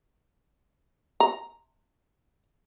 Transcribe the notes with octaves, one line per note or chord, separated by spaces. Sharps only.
A#5